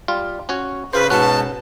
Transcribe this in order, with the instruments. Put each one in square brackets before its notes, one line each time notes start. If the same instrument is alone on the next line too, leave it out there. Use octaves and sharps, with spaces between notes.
[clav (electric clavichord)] G3 F4
C#4 F#4 C#5
[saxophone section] C#3 [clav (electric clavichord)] F4 C5 [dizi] B4
[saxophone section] G#2 B2 [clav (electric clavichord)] C#4 F#4 F#5 [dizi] A5